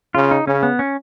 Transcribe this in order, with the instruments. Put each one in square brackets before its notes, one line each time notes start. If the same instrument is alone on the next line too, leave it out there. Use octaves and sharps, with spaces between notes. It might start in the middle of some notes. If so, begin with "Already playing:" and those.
[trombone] C#3 [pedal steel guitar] F4
[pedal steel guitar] D#4
[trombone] C#3 [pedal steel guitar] C#4
[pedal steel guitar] B3
C#4